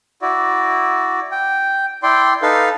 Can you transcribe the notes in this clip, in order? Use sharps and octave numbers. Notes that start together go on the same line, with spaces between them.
E4 F#4 D5
G5
E4 D5 G5 C6
D#4 A4 B4 F5